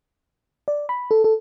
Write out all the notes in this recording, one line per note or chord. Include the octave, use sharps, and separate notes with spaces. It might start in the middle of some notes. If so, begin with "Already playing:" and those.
D5
B5
A4
A4